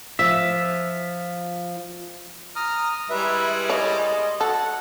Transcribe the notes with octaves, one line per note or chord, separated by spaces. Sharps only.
F3 E5
A#5 D#6 F6
G3 G#3 E4 B4 E5
C#5 D#5
F#4 A4 F#5